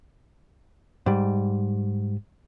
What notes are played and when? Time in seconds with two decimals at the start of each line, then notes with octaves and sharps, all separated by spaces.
1.06 G#2 G3